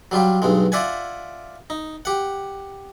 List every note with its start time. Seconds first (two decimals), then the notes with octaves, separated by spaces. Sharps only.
0.11 F#3 G3 F4 G4
0.42 B1 G2 G#3
0.72 F4 D5 E5 F#5 G#5
1.70 D#4
2.05 G4 F#5